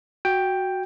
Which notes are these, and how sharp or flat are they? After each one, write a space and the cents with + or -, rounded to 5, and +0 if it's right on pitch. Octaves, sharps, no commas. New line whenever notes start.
F#4 +0 G5 +5